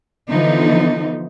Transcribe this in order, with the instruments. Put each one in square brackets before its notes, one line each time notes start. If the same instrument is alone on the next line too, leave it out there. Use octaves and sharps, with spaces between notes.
[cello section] D3 E3 F3 B3 D#4